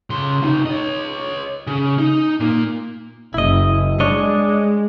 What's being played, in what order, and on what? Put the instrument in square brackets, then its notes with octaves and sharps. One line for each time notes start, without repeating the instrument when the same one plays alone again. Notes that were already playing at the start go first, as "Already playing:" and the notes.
[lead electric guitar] C#3 C6
C3 D#4
C#5 D#5
C#3
D#4
A#2 A#3
[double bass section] F#1 [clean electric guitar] E4 D#5
[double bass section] G#3 [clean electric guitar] D4 C#5 D#5